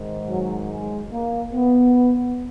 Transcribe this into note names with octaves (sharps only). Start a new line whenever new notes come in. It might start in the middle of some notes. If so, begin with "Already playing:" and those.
Already playing: G#2 D#3
F#3
G#3
A#3
B3